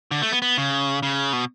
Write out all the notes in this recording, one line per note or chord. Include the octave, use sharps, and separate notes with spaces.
D3
A3
B3
B3
C#3
C#3
B2